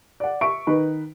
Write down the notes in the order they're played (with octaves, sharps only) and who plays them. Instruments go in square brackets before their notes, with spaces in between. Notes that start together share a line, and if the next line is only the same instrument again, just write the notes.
[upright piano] D5 F#5
E5 C#6 D7
D#3 D#4 B4